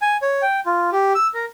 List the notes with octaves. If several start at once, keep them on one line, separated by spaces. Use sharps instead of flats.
G#5
C#5
G5
F4
G4
E6
A#4